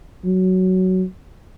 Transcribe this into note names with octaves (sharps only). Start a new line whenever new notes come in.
F#3